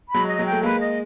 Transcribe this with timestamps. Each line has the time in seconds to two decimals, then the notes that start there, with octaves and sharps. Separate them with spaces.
0.09 B5
0.14 F#3 G#3
0.26 D#5
0.39 F#3 G#3
0.45 G5
0.52 A3
0.63 G#3 A#3 B4
0.81 D#5